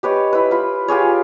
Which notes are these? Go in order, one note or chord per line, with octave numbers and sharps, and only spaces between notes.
G4 B4 C#5 D#5
E4 B4
F4 B5
F4 G4 G#4 C#5